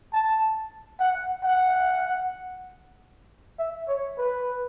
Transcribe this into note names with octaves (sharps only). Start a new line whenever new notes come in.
A5
F#5
F#5
E5
C#5
B4